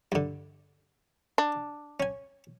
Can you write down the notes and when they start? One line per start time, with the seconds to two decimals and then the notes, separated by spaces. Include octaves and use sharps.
0.12 G2 D3
1.38 D4
2.00 C#4 G#5